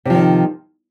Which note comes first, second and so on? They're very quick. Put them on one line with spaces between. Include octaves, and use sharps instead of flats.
C3 F3 D#3